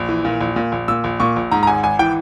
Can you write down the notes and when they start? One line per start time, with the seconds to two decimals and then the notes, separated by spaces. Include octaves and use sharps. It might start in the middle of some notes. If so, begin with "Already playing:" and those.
Already playing: A#1
0.09 E3
0.25 A#2
0.41 A#1
0.56 A#2
0.72 A#1
0.88 A#2 E6
1.04 A#1
1.20 A#2 C#6
1.36 A#1
1.51 G#2 A#5
1.63 A#5
1.67 G#1 G#5
1.83 G#1 G#5
1.99 E3 G5